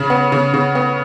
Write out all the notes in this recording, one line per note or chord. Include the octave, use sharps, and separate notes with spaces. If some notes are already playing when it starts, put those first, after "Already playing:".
Already playing: C#3
B3
C#3
C#3
B3